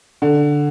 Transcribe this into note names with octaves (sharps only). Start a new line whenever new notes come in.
D3